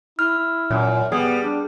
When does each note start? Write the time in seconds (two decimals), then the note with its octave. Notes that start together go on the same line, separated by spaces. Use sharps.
0.19 E4 F6
0.70 F#2 A#2
1.12 G3 B3 G#4
1.43 D4